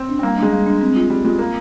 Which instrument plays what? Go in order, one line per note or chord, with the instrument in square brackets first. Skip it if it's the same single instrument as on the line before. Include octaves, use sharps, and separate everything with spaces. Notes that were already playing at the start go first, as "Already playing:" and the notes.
Already playing: [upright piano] C4
[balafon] D4
[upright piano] C4
[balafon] G3 [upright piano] A#3
[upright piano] G#3 [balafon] D4
[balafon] G3
D4
C4
F4
[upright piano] G3 [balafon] C4
[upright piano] G#3 [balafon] F4
[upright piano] A#3 [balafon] A#4